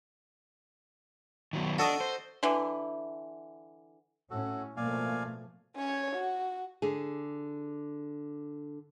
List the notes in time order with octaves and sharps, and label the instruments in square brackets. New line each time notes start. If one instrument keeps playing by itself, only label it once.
[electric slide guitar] D#3 F#3 B3
[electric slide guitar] D4 [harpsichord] F#4 A4 D#5
[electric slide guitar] C5
[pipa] D3 E3
[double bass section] A2 C#4 [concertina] F#4 A4
[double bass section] B2 F3 A3 [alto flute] A#3 [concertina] D5 F5 G#5
[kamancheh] C#4 C#5
F#4
[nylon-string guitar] D3 G#4